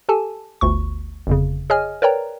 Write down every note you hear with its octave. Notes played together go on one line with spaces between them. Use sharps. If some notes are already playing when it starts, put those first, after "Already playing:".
G4 A4 G#5 A5
G1 D2 C#6
G1 F2 C#3
G#4 C#5 D#5 G#5 F6
A#4 B4 C#5 D5 G5 A#5